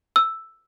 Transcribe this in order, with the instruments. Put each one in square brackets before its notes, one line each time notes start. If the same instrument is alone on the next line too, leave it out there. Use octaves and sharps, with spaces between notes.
[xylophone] E6